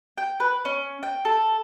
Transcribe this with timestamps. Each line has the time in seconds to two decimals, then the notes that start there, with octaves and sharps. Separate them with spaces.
0.18 G5
0.40 B4
0.65 C#4
1.03 G5
1.25 A4